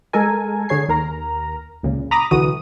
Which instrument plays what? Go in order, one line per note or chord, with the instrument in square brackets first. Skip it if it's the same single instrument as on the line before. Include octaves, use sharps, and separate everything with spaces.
[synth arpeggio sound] G#3 A4 A#4 G#5
D3 G#4 C#5 G#6 C7
D#2 A#4 A#5
C#2 A#2 C#3
A#5 B5 D6 D#6 A#6
C2 D3 E3 F#4 D#6 D#7